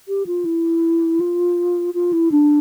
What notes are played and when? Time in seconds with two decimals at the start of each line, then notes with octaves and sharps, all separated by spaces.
0.08 G4
0.26 F4
0.45 E4
1.20 F4
1.94 F4
2.13 E4
2.32 D4